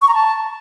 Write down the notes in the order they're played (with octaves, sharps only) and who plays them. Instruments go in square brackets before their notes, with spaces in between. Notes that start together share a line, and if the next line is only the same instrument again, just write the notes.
[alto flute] C#6
A#5
A5